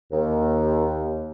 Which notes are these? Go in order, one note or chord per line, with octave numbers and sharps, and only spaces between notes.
D#2